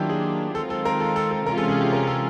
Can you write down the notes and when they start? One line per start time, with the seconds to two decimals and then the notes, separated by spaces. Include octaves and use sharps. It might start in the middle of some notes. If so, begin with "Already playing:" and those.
Already playing: D#3 F#3 A#3 D4 E4 F4 G4
0.09 G#4
0.55 D#3 G#3 C4 F4 A4
0.70 A4
0.85 A#4
1.00 A4
1.16 A4
1.31 A4
1.46 C3 E3 G#3 C#4 F4 A#4
1.58 A4
1.69 G#4
1.81 G4
1.92 A#4
2.07 A4